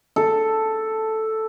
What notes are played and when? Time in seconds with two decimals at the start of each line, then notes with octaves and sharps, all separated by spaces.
0.16 A4